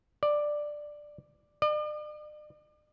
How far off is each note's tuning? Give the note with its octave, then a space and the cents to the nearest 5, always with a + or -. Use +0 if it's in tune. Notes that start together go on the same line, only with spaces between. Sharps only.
D5 +10
D5 +45